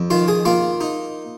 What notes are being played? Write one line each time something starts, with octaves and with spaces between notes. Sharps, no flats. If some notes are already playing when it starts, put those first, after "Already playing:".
Already playing: F2
D#3 F4 F5
G#4 G#5
A#3 F4 F5
D#4